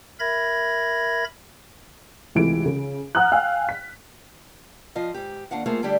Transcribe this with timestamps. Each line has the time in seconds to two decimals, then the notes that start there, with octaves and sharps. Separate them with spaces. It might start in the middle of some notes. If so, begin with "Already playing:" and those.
0.20 A#4 E5 B5 G#6 A#6
2.35 C#2 C3 E3 A3 D7
2.66 C#3
3.15 F#5 A#5 D#6 F6 F#6
3.32 F5 G5 G#5 E6
3.69 B6
4.95 F3 F4 D#5
5.14 G#2 G4
5.51 D#2 D4 F5 F#5
5.66 A3 A#3 F4 G#4 C5
5.83 D3 G3 A3 D4 G4 G#4